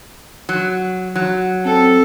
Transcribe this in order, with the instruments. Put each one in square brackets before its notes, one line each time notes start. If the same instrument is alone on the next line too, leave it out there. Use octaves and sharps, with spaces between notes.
[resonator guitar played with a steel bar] F#3
F#3
[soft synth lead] C4 [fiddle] A4